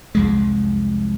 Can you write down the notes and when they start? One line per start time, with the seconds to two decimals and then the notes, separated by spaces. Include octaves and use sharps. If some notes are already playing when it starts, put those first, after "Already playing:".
0.15 C2 F2 G#3